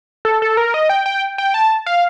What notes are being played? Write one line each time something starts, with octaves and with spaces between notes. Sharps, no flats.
A4
A4
A#4
D#5
G5
G5
G5
A5
F5